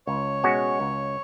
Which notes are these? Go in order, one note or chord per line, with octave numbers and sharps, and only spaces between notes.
C#2 C#5
B2 G#3 C#4 F#4
C#2